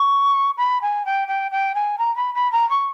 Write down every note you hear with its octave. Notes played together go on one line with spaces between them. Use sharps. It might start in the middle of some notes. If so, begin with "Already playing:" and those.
Already playing: C#6
B5
G#5
G5
G5
G5
G#5
A#5
B5
B5
A#5
C#6